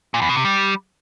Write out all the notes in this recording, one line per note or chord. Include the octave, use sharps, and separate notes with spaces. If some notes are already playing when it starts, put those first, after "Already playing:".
A#2
E2
B2
C3
G3